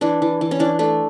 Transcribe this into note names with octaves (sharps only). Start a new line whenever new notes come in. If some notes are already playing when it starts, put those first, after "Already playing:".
E3 D4
E3
E3
C#4
E3 D4
A3 D4